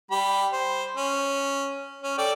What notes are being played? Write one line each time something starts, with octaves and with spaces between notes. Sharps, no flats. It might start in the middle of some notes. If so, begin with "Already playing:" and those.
G3 G4 B5
C5
C#4
C#4
A4 D5 G5